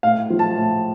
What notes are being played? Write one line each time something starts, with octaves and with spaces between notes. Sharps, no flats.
A2 F5
F3
A5
A2